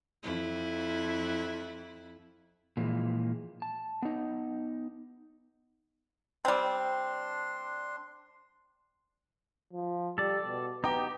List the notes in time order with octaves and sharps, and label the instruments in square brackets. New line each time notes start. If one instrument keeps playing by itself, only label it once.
[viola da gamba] F2 E4
[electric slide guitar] A#2 E3 F3 G3 G#3
A5
B3 D#4
[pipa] G3 C4 [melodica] D4 C6
[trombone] F3
[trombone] G3 [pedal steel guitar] A4 D5
[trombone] B2
[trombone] B3 [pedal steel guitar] D#4 G4 [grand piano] G5 A#5 D6